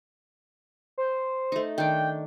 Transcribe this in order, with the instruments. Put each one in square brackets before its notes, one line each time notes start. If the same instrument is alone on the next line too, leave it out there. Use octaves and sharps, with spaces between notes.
[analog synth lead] C5
[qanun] A3 D#4
[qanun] D#3 D4 [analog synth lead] G5